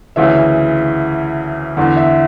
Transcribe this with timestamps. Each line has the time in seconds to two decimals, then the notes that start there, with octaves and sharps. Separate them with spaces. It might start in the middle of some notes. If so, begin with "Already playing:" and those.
0.16 D2 C#3 E3 E5
1.77 E2 D3
1.97 E5